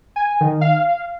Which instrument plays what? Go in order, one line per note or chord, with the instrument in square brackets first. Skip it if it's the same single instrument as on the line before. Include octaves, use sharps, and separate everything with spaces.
[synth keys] G#5
D#3
F5